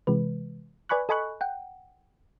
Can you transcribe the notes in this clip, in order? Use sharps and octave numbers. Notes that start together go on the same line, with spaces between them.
C3 E3 G#3 B4
B4 D5 G#5 B5 C#6 F#6
A4 D#5 G#5 B5 C#6 F#6
F#5 G5